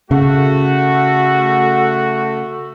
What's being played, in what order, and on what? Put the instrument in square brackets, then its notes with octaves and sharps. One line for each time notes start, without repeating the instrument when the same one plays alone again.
[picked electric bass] C#3 [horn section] A3 F#4